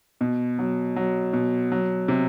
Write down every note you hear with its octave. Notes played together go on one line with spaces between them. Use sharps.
B2
F#3
F#3
B2
F#3
C3